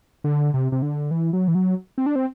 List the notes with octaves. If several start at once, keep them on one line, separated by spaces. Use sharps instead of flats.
D3
C3
C3
D3
E3
F#3
E3
F#3
C4
D4
C4